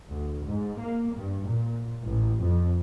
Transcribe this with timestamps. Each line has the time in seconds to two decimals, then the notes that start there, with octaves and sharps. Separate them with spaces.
0.10 D2
0.44 G#2
0.79 A#3
1.15 G2
1.46 A#2
2.07 A1
2.41 F2